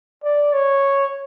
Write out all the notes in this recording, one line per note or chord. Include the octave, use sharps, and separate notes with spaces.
D5
C#5